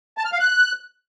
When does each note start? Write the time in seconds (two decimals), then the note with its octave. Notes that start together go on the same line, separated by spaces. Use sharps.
0.18 A5
0.25 F6
0.32 F5
0.40 F#6